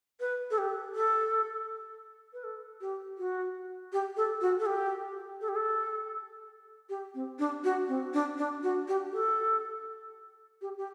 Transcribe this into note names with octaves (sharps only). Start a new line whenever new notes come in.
B4
A4
G4
A4
B4
A4
G4
F#4
G4
A4
F#4
A4
G4
A4
G4
A4
G4
C4
D4
F#4
C4
D4
D4
F#4
G4
A4
G4
G4